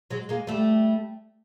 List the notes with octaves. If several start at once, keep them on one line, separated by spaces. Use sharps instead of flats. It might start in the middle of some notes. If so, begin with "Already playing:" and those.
F#3 G#3
G#3 A#3
G3 A3